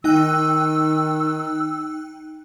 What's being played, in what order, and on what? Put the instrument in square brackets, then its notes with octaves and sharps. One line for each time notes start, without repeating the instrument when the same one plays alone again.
[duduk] D#3 [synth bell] D#4 G5 F#6 [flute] E6